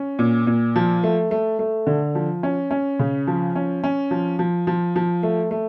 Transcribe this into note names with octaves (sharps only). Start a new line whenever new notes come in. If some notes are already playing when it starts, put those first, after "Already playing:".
Already playing: C#4
A#2
A#2
F3
A3
A3
A3
D3
F3
C#4
C#4
C#3
F3
C#4
C#4
F3
F3
F3
F3
A3
A3